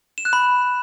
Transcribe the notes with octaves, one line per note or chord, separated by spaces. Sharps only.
E7
F#6
B5